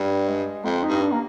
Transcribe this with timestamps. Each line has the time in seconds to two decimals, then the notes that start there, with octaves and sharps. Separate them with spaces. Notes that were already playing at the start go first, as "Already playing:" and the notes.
Already playing: G2 G3
0.28 G#3
0.65 F2 C4
0.83 D#4
0.89 G2
1.01 D4
1.12 A#3